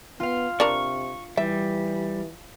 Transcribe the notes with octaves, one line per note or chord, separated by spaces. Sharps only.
B3 F4 F5
C3 D4 A#4 C#6
E3 G3 E5